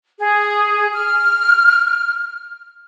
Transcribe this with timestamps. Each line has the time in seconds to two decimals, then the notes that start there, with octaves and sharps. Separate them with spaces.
0.19 G#4
0.94 F6